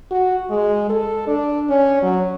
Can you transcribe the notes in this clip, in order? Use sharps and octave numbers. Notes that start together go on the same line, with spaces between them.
F#4
G#3
A4
D4
C#4
F#3